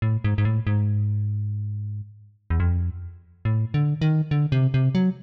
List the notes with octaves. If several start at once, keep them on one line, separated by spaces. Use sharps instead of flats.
A2
G#2
G#2
A2
G#2
E2
F2
A2
D3
D#3
D3
C3
C3
F#3